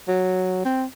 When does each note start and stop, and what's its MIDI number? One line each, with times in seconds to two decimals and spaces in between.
0.08 0.62 54
0.65 0.84 60